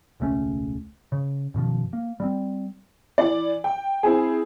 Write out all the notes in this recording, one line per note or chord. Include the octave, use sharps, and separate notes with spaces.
E1 C#2 A3 C#4
C#3
F#2 B2 D#3 F3
A#3
G3 G#3 C4
E3 D5
G5
C4 E4 G#4